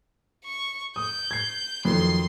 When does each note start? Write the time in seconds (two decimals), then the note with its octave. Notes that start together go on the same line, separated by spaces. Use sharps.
0.45 C#6
0.96 D#6 G6
1.31 G#6 C7
1.85 F2 D#3 F#3 C6